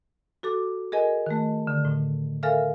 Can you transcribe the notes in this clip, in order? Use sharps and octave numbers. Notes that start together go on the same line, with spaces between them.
F#4 A4 D6
G#4 A#4 D#5 G#5
D#3 A3
D3
A2 D3
A4 A#4 E5 F5 G#5 F6